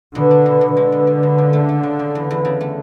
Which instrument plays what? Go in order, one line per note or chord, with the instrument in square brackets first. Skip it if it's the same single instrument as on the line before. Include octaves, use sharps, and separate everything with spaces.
[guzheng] B2 [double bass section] D3
[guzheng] D4
B2
B2
[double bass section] D3 [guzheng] G#3
[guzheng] B2
B2
B2
C#3
A3
A3
C#3
C#3
E2
E2
C#3
A3